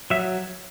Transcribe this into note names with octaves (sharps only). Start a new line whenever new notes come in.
F#3 E5